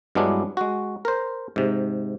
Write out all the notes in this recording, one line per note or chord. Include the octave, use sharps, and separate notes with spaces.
G2 F#3 G#3 B3 D4 E4
G#3 F#4
A#4 C5
G#2 C3